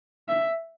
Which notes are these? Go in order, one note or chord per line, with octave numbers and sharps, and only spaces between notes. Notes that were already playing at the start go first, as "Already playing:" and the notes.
E5